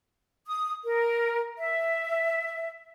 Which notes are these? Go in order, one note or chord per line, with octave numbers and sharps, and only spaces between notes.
D#6
A#4
E5